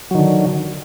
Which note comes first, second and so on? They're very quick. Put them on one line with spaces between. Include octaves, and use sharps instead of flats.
F#3 D#3 D3